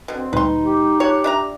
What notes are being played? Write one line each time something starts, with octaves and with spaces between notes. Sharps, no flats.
B2 D3 C4
D2 A#2 G3 D#4 B4 C6
G4
F4 G4 C#5 A5 F#6
D4 E5 A#5